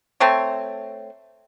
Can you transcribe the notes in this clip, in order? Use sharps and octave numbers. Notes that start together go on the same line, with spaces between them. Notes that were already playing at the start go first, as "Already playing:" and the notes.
A3 C4 C#5